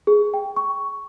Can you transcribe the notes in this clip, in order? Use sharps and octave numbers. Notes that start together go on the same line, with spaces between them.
G#4
G5
C#6